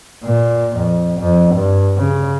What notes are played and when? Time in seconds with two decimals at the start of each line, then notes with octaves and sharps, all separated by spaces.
0.24 A#2
0.76 F2
1.19 F2
1.55 G2
1.97 C#3